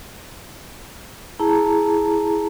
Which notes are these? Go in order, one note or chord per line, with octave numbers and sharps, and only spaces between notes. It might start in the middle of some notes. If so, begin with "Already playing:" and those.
E4 G#4 A5 A#5